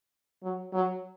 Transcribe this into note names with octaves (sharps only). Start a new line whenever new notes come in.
F#3
F#3